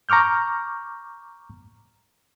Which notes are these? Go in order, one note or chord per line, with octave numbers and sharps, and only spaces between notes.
A#5 C#6 D6 F6 G6